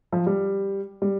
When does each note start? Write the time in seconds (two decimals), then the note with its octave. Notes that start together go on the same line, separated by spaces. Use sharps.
0.12 F3
0.27 G3
1.02 G3